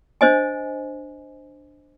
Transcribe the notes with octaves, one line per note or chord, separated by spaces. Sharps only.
D4 C5 D#5 G#5